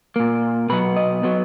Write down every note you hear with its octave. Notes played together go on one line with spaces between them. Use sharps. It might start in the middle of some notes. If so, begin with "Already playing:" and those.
A#2 A#3
B2 F#3 B3 B4
D#5
F#3 B3